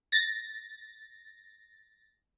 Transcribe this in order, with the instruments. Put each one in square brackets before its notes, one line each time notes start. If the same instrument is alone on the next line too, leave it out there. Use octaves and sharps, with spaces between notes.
[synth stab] A6 A#6